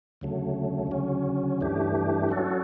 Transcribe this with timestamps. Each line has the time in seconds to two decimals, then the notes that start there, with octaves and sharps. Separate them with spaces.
0.21 D2 C#3 F#3 A3
0.91 D2 C#3 F#3 C#4
1.61 G2 E3 A3 D4 G4
2.29 F#3 C#4 F#4 A4